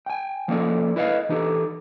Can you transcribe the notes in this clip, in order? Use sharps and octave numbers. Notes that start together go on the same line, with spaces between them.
G5 G#5
F3 A#3 C#4 D#4 A4 D5
E4 B4 D#5 F5
E3 D#4 G4 A4